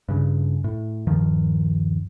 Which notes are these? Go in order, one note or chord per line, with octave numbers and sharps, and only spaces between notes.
G2 C#3
A2
D#1 G2 D#3 F3